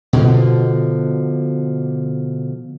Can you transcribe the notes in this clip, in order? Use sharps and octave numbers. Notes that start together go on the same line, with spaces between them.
B2 D3 F3